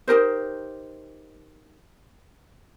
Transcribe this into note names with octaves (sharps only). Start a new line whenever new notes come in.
D#4 G4 A#4 C5